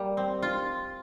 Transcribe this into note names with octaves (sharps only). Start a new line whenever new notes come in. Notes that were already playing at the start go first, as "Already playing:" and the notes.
Already playing: G3 A#3
C4
F4